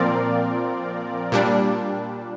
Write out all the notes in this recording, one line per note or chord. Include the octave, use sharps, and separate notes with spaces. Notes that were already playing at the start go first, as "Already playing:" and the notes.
Already playing: A#2 F3 C4 F4 A#4 D5
A#2 G3 D4